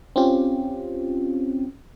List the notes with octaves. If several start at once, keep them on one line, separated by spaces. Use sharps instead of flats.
C4 C#4 F4 G4